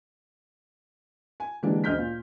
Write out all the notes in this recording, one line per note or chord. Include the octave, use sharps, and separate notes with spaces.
G#5
D3 E3 G#3 A#3 D4 G4
D2 D#5 F6 G6 B6
A#2